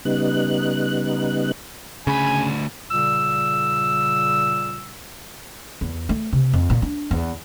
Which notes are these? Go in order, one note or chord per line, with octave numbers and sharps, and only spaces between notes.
C#3 G3 B3 D#4 F#6
D2 C#3 G#5 B5
A#2 C#3 G3 E6
E2
A3
C3
F2
A#2
D4
E2